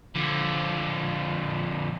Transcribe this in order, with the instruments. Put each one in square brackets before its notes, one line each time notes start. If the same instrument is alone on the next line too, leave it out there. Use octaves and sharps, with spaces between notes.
[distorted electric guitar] F2 D3